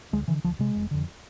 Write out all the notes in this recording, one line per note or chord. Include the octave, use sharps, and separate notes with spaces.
D2 G#3
D3 E3
D2 F3
C3 G#3
F1
F2 D3